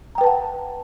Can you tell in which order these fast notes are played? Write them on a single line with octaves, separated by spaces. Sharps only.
A#5 G5 B4 A5 F#5